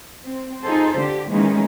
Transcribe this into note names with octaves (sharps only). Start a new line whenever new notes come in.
C4
D#4 F4 G#4 A4 C5
D3 G4
D#3 E3 G#3 A#3 C#4 D#4